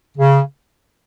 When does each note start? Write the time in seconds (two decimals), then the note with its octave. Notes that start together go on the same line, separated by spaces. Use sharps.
0.18 C#3